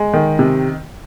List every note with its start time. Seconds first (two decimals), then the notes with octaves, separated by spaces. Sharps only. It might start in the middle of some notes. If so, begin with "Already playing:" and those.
Already playing: G#3
0.14 D#3
0.39 C3